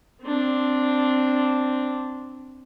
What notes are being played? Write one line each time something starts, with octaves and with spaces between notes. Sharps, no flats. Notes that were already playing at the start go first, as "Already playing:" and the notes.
C4 D4